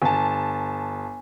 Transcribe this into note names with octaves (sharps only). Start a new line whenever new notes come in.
G1 G#5 A5